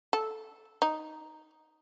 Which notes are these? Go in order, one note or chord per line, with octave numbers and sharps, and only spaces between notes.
A4
D#4